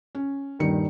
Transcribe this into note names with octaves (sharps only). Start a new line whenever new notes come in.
C#4
D#1 G2 D#3 C#7